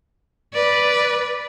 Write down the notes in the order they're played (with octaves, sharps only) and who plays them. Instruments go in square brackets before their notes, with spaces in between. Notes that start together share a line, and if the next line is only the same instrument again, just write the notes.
[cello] B4 D5